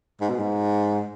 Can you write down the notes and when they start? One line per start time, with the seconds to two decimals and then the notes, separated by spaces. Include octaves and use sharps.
0.21 G#2
0.30 B2
0.39 G#2